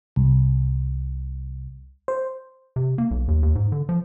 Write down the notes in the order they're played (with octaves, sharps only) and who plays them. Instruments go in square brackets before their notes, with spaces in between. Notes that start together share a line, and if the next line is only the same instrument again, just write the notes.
[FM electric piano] C2
C5
[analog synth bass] C3
A#3
B1
D#2
D#2
G#2
D3
F3